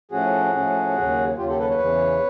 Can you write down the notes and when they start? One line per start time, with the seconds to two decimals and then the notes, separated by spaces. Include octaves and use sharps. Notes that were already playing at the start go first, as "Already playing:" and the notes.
0.11 A2 F3 A3 C#4 F#4 G#4
0.54 A2 F3 A3 C#4
0.97 D#2 C#3 F#3
1.38 D#2 C#3 F#3 F4 G4
1.49 G4 A4
1.59 A4 B4
1.70 B4 C#5
1.80 E2 C#3 E3